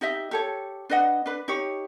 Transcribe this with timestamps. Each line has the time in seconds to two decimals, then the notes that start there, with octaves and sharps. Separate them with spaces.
0.01 D#4 G4 D#5 E5
0.31 G4 A4 C#5
0.90 D4 B4 D#5 F#5
1.26 D4 B4
1.48 D#4 G4 C#5